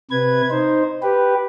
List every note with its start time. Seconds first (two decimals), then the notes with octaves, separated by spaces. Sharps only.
0.11 C3 B4 G#6
0.51 D#4 C5
1.03 G4 B4